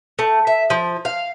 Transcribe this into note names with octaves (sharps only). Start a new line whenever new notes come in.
A3
E5
F3
F5